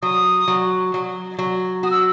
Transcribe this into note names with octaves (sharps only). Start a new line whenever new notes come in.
F#3 D#6
F#3
F#3
F#3
F#4 D#6
E6